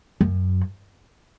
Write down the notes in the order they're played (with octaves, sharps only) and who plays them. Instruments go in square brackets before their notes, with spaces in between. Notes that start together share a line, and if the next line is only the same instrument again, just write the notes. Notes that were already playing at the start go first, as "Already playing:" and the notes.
[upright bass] F#2